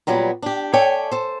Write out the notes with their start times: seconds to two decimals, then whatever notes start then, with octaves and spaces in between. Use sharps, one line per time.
0.07 A#2 F#3 G3 B3
0.42 D4 G4
0.73 A4 C#5 D5 E5 G5 G#5
1.11 A4 C5